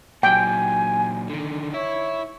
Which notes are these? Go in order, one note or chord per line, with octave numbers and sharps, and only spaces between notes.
A#2 F#3 G5 G#5
D3 D#3
E4 C#5 E5